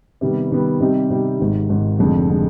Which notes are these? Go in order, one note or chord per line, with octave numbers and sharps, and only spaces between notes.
C3 D#3 G3 B3
C3 D#3 G3 B3
C3 G3 C4 D#4 G4
C3 G3 C4 D#4 G4
G#1 G#2 D#3
G#1 G#2 D#3
F1 F2 D3 G#3 C4
D3 G#3 C4